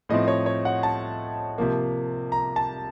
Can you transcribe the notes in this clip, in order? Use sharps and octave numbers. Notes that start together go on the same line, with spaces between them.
A2 F3 A3 C4 D#5
C#5
C#5
F#5
A5
C3 F3 A#3
A#5
A5